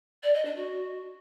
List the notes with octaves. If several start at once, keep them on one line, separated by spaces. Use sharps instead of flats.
D5
D#5
D4
F#4